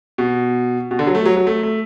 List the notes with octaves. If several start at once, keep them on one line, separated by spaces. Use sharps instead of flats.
B2
B2
D3
F#3
A3
F#3
F#3
A3
A3